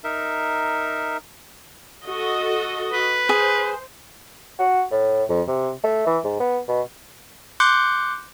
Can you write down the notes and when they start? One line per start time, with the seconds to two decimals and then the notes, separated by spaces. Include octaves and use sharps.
0.04 D#4 A#4 E5
2.06 F#4 A4 D#5
2.93 B4
3.29 G#4 C5
4.59 F#4
4.91 A2
5.29 F2
5.48 C3
5.83 A3
6.06 E3
6.24 G#2
6.40 B3
6.68 B2
7.60 C6 D6 F#6 G6 C#7